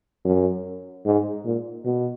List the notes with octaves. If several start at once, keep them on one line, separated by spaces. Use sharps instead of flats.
F#2
G#2
A#2
B2